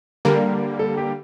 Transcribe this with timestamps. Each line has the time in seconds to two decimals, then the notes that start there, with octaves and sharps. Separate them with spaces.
0.25 D3 G3 A#3 A#4
0.79 A4
0.97 G4